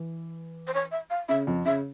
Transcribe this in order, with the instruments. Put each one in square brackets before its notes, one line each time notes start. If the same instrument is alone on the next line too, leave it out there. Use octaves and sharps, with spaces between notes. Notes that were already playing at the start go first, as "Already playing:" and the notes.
Already playing: [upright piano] E3
[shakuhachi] C5
C#5
E5
F5
[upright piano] C#3 [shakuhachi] E5
[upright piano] F2
[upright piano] C#3 [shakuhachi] E5